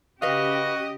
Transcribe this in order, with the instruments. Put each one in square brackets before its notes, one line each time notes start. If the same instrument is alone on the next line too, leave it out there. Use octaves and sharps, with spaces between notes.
[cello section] C#3 G4 [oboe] F#4 [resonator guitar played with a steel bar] B4 F5 [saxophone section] D#5